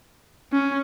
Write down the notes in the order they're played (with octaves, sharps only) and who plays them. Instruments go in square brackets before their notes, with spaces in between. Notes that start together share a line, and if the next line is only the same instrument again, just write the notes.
[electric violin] C#4